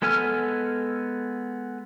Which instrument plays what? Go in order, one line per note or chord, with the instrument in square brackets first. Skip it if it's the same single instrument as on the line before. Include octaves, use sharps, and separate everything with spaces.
[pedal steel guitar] G#3 B3 A4 G#5 F6